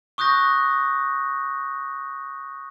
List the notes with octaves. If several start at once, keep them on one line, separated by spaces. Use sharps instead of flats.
C#6 D#6 F#6 G6 A#6